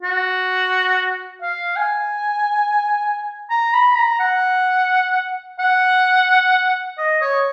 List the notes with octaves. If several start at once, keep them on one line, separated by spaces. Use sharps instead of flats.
F#4
F5
G#5
A#5
B5
A#5
F#5
F#5
D#5
C#5